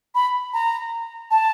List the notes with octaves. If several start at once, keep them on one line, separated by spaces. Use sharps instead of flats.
B5
A#5
A5